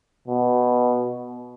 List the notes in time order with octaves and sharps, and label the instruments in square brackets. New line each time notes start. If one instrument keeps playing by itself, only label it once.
[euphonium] B2